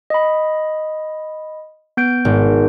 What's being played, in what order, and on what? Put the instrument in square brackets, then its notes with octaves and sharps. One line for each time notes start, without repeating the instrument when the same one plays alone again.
[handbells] D#5 B5
B3 G6 D7
[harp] G#1